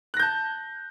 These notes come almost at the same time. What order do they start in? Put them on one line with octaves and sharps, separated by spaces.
F#6 A#6 G6 A5